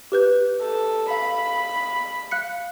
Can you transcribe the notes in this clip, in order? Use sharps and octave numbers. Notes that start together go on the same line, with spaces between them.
G4 B4 G6
A4
F5 B5
F5 F#6 C#7